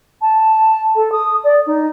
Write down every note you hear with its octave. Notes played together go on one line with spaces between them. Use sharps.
A5
A4
D#6
D5
D#4